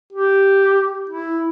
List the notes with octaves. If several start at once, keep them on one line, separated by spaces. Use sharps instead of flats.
G4
E4